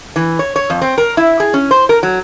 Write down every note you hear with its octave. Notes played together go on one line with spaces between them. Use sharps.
E3
C#5
C#5
F2
C4
A#4
E4
G#4
C#4
C5
A#4
F#3